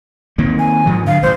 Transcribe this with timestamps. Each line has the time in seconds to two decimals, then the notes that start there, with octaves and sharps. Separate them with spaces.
0.38 D#3 A#3 C4
0.59 G#5
0.86 G#2 F3 F#3
1.07 D3 F#3 F5
1.23 A1 G2 C5